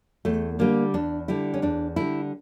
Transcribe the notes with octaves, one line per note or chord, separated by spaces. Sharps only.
E2 A3
D3 G3 A#3
E2 D4
D3 G3 E4
C#4
E2 D4
D3 G3 E4